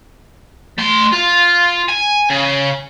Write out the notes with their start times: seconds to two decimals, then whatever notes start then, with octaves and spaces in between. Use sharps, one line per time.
0.78 A3 C6
1.13 F4
1.89 G#5
2.30 C#3